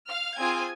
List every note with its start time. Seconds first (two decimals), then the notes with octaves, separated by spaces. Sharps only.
0.08 F5 F6
0.37 C4 F4 G#4 G#5 G#6